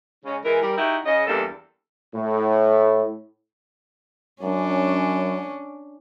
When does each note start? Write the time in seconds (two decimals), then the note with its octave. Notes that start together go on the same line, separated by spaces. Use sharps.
0.24 C#3 G#3 C#4
0.45 E3 G#3 A#4
0.62 G3 A#4
0.78 D#4 E4 F#4 G4
1.05 C#3 D#5
1.27 E2 G2 A#3 A4
2.14 A2
4.42 F#2 C#4 D4